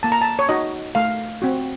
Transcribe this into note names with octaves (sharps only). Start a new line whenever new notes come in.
A#3 A5
A#5
A5
C#5
D#4 F#4 D#5
A3 F5
C4 F#4